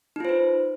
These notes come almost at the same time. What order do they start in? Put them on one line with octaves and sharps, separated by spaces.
D#4 F4 C5 B4